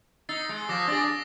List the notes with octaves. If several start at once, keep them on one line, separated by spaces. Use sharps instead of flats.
D#4 E6 A6 C7
G#3
F3 D6 A#6 E7
D4 G#4 D6 A6 A#6